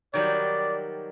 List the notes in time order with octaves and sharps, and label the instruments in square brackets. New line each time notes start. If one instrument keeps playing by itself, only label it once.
[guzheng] D#3 F#3 G3 [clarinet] D5